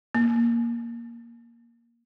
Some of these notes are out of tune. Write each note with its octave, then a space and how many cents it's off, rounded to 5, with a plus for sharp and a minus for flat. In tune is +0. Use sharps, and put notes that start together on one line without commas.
A#3 +5